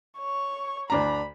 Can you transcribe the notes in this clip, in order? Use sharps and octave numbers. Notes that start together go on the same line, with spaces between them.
C#5 C#6
D2 D4 A#5 B5